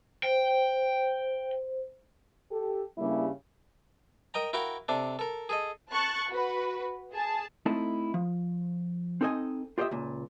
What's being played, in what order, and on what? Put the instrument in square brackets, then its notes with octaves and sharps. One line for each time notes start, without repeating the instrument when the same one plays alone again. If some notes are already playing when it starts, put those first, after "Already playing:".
[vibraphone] C5 [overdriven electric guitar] G5
[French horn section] G4 A4
G2 C#3 G3 A#3 E4
[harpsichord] A#4 D#5 G5 A#5
E4 F#4 A#4 F5 G5
C3 D4 A4
A4 A#4
G#4 A4 D#5
[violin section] A5 C#6 F#6 A6
F#4 B4
G#4 A5
[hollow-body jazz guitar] A3 C4 D#4 E4 A4 A5
F3
C4 D#4 A4 C#5 D#5 G#5
F4 G4 C5 C#5 D#5 E5
C#2 A#2